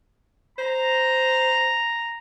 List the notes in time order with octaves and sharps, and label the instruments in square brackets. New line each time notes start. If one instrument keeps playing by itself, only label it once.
[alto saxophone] C5 [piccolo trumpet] A#5